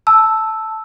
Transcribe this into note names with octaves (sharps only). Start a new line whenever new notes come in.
A5 E6